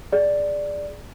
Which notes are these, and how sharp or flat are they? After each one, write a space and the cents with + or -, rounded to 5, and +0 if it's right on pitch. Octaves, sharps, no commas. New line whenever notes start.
G#4 +0 D5 +0